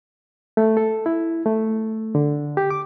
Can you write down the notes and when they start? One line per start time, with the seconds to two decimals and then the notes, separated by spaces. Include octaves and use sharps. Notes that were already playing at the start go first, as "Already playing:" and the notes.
0.57 A3
0.77 A4
1.06 E4
1.46 A3
2.15 D3
2.57 G4
2.71 D6